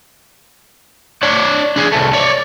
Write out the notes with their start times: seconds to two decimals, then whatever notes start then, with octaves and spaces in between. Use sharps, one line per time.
1.23 D4 C#5
1.76 D4 G#4
1.92 C2 A3
2.13 C#5 D5